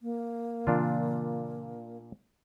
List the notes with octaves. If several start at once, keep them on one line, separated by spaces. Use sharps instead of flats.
A#3
A#2 C#3 E3 C4 D4 F4